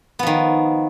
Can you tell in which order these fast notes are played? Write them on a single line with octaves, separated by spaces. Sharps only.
B3 F3 D#3